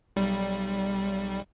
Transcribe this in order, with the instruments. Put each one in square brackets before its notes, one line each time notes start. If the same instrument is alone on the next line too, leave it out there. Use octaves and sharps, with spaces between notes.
[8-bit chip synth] B1 G3